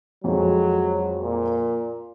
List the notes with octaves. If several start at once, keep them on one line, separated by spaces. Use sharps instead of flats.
F2 F#3 G#3
A#2